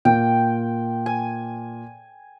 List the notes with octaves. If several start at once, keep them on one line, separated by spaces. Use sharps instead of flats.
A#2 G5
G#5